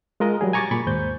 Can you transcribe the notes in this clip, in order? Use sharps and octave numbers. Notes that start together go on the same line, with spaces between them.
G#3 F4 A#4 D#5
F#3 G3 G#4
G#5 A#5 C#6 D6 G#6 A6
A#2 B5 C#6
D#2 G#2 C5 G6